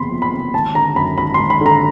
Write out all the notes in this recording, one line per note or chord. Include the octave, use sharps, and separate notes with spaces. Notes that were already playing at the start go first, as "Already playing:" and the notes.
Already playing: F#1 E2 C3 B5 C6
F3
B5
C3
G#1 A5
D3 A#5
F#2 B5
G#1 B5
C6
G#1
B5
D3 A#5